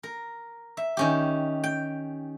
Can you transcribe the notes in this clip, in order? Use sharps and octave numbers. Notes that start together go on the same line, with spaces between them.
A#4
E5
D#3 C#4 G4
G5